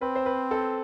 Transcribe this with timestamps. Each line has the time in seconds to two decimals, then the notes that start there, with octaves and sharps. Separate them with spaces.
0.01 C4 B4
0.16 C5
0.26 B4
0.51 A4